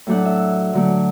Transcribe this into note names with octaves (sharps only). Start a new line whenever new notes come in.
A2 F#3 A3 D4 F#5
E5
D3 F#3 A3